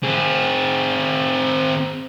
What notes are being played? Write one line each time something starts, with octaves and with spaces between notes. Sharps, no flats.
C4 G#4